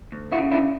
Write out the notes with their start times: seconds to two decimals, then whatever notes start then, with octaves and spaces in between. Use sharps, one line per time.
0.12 D2
0.32 E4 F#4
0.39 C#3
0.52 D4 E4